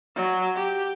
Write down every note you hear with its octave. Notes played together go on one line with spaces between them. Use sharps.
F#3
G4